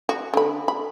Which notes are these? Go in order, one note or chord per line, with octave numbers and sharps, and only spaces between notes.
F#4
D3 B5
B5